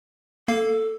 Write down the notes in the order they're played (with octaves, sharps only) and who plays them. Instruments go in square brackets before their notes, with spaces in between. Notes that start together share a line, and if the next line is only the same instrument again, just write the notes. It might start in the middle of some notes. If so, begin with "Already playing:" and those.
[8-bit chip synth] A#3 F5 [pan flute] A4